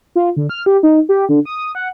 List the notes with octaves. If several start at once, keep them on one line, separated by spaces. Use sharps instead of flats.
F4
D3
F6
G4
D#4
G4
D3
D#6
F#5